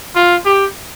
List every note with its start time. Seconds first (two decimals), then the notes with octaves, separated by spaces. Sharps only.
0.16 F4
0.45 G4